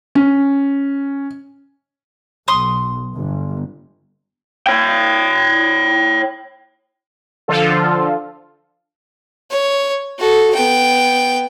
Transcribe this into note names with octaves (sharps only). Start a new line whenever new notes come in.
C#4
B1 C6 D#6
G1
C#5 G5
D3 F3 F4 A4
C#5
F#4 A4
B3 G5